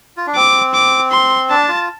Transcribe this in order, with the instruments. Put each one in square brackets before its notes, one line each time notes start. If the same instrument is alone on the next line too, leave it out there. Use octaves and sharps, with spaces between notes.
[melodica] F4
D4
[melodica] C4 [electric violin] D6
[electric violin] D6
C6
[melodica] D4 [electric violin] A5
[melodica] F4